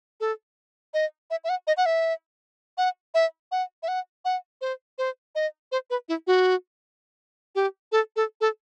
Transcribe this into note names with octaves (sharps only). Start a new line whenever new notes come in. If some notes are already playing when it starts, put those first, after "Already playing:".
A4
D#5
E5
E5
F#5
D#5
F#5
E5
F#5
E5
F#5
E5
F#5
F#5
C5
C5
D#5
C5
B4
E4
F#4
G4
A4
A4
A4